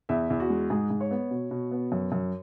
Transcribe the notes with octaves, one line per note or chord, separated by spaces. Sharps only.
E2 E5
E2
F#4
G#3
G#2 G#4
G#2
C#5
B3
B2
B2
B3
F#2
F#2